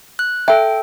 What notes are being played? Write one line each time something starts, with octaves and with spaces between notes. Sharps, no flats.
F#6
A4 E5 G5